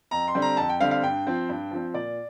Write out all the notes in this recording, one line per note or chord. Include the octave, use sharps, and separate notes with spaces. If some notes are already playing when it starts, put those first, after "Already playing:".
F2 A#5
C6
D3 G3 C4
A#5
F2 A5
G5
D3 G3 C4 F5
F5
G2 G5
F3 C4
G2
F3 C4
A#2 D5